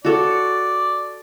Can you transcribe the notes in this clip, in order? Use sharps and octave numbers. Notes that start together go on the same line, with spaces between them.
F#4 A4 C#5 D5